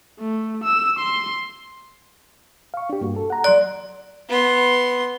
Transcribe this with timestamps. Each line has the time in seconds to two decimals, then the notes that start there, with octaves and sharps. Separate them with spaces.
0.19 A3
0.64 E6
0.99 C6
2.74 F5 C#6
2.90 D4 G4
3.01 G2 A#3 F#4
3.16 A4
3.30 F#5 A#5
3.44 F#3 D5 C6 F#6
4.29 B3 C6